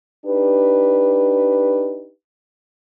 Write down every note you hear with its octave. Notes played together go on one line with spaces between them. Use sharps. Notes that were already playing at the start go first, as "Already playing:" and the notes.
D4 D#4 G4 B4